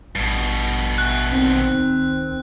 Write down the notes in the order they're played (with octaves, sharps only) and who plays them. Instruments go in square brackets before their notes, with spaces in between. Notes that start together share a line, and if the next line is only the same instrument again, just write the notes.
[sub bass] A1 [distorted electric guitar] G2 B2
[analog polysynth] E5 G#5 C#6 [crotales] F#6
[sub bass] A#1 [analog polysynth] D#3 C4
[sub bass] C#2